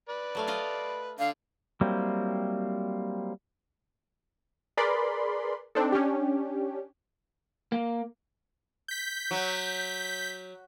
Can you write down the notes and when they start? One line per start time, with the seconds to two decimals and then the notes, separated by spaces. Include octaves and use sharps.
0.09 B4 D5
0.35 F#3 A3 F5
0.47 F4 D#5 F5
1.19 D3 F5
1.81 F#3 G3 A#3 C4 E4
4.77 G#4 A#4 B4 D5 B5 C6
5.75 C4 D4 D#4 A4
5.92 C#4 D4 G4
7.72 A#3
8.88 G6 B6
9.31 F#3